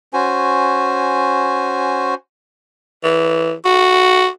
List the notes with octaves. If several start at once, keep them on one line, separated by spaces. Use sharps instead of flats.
C#4 F#4 C5 G#5
E3
F#4